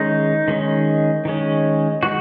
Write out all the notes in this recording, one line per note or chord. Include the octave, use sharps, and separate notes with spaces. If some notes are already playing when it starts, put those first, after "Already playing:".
Already playing: D#3 G#3 C#4 D#4
D#3 G#3 C#4
D#3 G#3 C#4
D#3 G#3 F#4